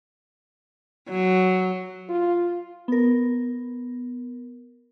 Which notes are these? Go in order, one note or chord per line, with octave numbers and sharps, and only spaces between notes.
F#3
F4
B3 A#4